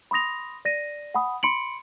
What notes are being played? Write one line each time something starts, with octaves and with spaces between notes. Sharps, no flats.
B5 C6 D#6 A#6 F7
D5 A#6 D#7
F#5 G#5 B5 D#6
B5 C6 C#7 D7 F#7